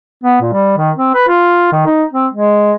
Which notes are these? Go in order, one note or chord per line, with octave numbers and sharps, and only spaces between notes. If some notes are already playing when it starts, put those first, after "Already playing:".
B3
A#2
G3
D#3
C4
B4
F4
D#3
D#4
C4
G#3